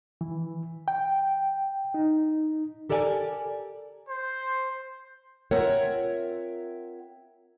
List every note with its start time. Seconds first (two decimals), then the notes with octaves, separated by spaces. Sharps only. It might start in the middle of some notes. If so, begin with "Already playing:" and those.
0.21 E3
0.88 G5
1.94 D#4
2.89 G4 A4 A#4 D5 E5 G#5
4.09 C5
5.51 C4 F4 A#4 C#5 E5 F#5